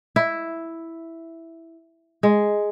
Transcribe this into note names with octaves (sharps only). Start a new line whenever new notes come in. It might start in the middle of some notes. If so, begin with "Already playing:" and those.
E4
G#3